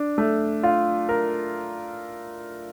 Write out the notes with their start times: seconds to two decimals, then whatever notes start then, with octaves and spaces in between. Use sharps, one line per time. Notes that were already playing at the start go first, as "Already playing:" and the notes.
Already playing: D4
0.18 A3
0.63 F4
1.09 A#4